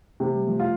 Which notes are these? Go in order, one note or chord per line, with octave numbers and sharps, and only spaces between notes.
C3 A3
G3
F3 A3
F4